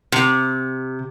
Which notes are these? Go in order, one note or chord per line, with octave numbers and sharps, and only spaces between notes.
C3